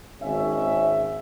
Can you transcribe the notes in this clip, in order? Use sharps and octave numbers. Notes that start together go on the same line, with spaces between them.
G#1 C#4 E5